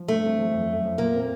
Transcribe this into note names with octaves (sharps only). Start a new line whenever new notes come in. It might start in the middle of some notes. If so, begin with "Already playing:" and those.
Already playing: F3
G2 A3
C4
F3
F2
F#2
F3
A#2 A#3
C4